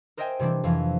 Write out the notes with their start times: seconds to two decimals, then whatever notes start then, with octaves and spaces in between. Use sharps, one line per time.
0.17 A#4 C5 D#5 E5 G5 G#5
0.39 C3 E3 G3 C4 D4
0.64 F2 E3 F3